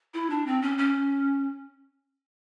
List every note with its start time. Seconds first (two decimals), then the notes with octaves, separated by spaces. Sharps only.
0.14 E4
0.30 D4
0.46 C4
0.62 C#4
0.78 C#4